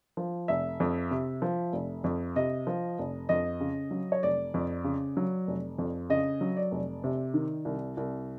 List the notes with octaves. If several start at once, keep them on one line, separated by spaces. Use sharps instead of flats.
F3
F1 E5
F2
C3
F3
F1
F2
C3 D#5
F3
F1
F2 D#5
C#3
F#3
C#5
F1 D5
F2
C#3
F#3
F1
F2
C#3 D#5
F#3
D5
F1
C3
D#3
C2
C2